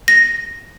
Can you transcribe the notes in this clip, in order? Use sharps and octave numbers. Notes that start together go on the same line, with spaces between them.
A#6